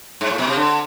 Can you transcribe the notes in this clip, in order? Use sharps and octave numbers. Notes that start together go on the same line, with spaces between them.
G#2
A2
B2
C3
D3